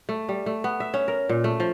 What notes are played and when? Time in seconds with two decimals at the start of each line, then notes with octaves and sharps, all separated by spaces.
0.09 A3
0.29 G3
0.46 A3
0.64 B3
0.80 E5
0.94 C#4
1.08 A#4
1.29 A#2
1.44 A3
1.60 F3